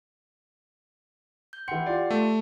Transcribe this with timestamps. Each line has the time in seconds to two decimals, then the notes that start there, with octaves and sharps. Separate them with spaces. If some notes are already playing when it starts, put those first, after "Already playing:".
1.53 G6
1.68 E3 F#5 G5 C6 C#7
1.86 F4 G4 D5
2.10 A3